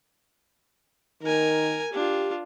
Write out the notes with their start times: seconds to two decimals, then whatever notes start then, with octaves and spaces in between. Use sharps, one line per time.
1.23 D#3 A#4 G#5
1.93 D4 F4 G4